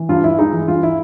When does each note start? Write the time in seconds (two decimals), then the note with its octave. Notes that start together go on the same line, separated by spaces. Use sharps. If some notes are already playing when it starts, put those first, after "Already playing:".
Already playing: E3
0.09 G2 F4
0.23 G2 E4
0.38 G#3 D#4
0.53 E3
0.68 G2 F4
0.83 E4